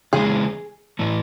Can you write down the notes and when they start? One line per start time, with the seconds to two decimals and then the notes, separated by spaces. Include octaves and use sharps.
0.13 C#3 E3 G#3 G#4
0.99 A2 E3 A3